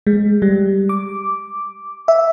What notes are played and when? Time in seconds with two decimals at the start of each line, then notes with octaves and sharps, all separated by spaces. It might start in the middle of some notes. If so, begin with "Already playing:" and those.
0.07 G#3
0.42 G3
0.89 D6
2.08 E5